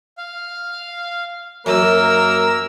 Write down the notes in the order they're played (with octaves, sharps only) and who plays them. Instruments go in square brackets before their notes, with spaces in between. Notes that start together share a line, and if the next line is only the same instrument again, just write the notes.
[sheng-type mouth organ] F5
[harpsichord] F#2 [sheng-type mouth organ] A#3 [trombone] A#4 [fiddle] E6